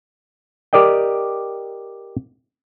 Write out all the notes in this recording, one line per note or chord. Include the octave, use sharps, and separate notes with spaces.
G4 A#4 D5 D#5 G5